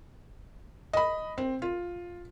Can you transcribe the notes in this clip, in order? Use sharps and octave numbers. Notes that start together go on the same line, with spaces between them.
D#5 B5
C4
F4